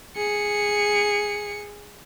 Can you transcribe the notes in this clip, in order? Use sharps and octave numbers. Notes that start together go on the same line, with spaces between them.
G#4 C#7